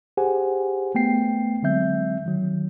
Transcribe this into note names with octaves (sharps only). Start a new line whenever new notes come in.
G4 G#4 C5 F#5 G#5
A3 B3 G5 C7
D3 F#3 G#3 C4 E5 G6
D#3 F#3